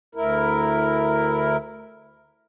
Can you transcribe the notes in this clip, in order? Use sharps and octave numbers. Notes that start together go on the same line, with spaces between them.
D2 E4 A#4